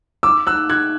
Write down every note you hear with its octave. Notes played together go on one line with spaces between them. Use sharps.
D6 E6
E6 F#6
F#6 G#6